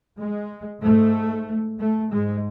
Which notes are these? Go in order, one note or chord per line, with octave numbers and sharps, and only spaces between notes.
G#3
G#2 A3
A3
G#2 G#3